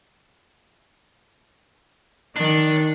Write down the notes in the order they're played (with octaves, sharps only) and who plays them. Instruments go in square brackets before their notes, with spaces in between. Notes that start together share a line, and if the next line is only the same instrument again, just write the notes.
[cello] D#3 [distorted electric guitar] D4